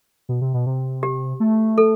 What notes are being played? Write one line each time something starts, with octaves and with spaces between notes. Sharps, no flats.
B2
C3
B2
C3
G4
A3
A4